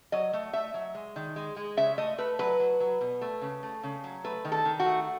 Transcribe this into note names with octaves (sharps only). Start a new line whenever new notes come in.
F#3 D#5
A3
A3 E5
F#3
G#3
D#3
G#3
G#3
C#3 E5
A3 D#5
A3 B4
F#3 B4
F#3
F#3
B2
A3
C#3
A3
C#3
F#3
A3 B4
D#3
A4
D#3
F#4
A3